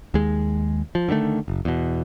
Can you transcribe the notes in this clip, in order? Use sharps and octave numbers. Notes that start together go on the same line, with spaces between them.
D#2 G#3
F3
D3 D#3 F3 A3
F#1
E2 B2